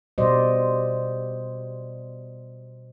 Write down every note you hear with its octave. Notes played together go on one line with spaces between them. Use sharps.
B2 G3 F#4 C5 D5 D#5